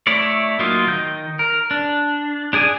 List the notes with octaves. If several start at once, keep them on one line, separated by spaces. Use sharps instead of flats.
A3 E4 C#5 D5
F#3 A#3 D#4 F4
D#3 D#5 G6
A#4
D4
D4 G#4 D5 G#5